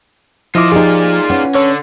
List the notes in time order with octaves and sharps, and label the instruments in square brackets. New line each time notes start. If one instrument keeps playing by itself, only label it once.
[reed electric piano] F3 E4 D6 [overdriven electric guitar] F4 D#5
[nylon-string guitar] F3 G4 C5 [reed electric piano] D#4 G#4 [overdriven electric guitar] F4 D5
[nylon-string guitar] C#4 B4 F#5
[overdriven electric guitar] D3 [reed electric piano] C#5